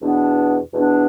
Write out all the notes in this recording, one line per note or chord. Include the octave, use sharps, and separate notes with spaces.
E2 B2 B3 D4
E2 B2 B3 D4